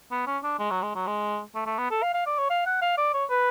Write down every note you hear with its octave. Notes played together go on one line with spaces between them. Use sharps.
B3
C#4
D4
G#3
F#3
G#3
F#3
G#3
A3
A3
B3
A4
F5
F5
D5
C#5
F5
F#5
F5
D5
C#5
B4